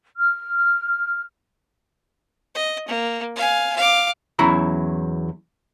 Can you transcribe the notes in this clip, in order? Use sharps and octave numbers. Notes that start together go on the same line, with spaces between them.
F6
D#5
A#3
F5 G#5
F5 D6
E2 F#3 C#4 E4 A#5 B5